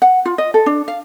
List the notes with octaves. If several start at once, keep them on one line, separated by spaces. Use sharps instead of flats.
F#5
F4
D#5
A4
D4
F5